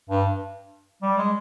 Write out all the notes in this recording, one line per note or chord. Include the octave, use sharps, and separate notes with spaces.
G2
G3
G#3